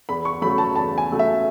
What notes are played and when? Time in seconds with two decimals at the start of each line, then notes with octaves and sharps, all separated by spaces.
0.09 E2 B5
0.25 C#6
0.42 C#3 F#3 A3 B5
0.58 A5
0.75 E2 A5
0.98 G#5
1.09 C#3 F#3 A3
1.19 E5